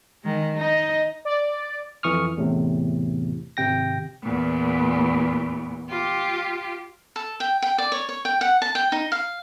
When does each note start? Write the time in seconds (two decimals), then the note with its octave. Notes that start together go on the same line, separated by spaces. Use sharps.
0.23 D#3 G#3
0.57 D#4 D#5
1.25 D5
2.03 F2 E3 C#6 D#6 F6
2.37 E2 A2 C3
3.57 G#1 C3 G5 A#6
4.22 E2 A#2
5.90 F4 G4
7.16 A4
7.40 G5
7.62 G5
7.78 D5
7.92 C#5
8.09 C#5
8.25 G5
8.41 F#5
8.62 A5
8.75 G5
8.92 D#4
9.12 F5